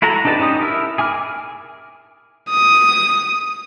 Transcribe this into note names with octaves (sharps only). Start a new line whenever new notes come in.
E4 F#4 A4 A#5
D4 D#4 G4 B4 A5
C#4 D#4 G4 D#6
E4 A#4 E5
G#4 G#5 D6 F6
D#6